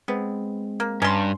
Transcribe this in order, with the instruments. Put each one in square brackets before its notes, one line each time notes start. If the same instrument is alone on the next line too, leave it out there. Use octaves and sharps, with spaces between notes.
[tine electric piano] G#3 C4 [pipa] B3
[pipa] A#3
[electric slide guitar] G2 [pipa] C#4 C6 [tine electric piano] A#5